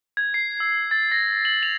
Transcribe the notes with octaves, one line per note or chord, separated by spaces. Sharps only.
G#6
C7
E6
A6
A#6
F#7
F7